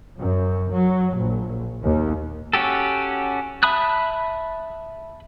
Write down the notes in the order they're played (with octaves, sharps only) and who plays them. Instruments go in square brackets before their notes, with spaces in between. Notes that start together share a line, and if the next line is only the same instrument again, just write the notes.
[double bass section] F#2
F#3
A#1
D#2
[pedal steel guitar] C#4 F#4 G4 A4
E5 A5 B5 D#6 F#6